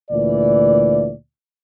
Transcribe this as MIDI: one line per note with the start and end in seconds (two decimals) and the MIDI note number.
0.11 1.12 38
0.11 1.12 46
0.11 1.12 52
0.11 1.12 74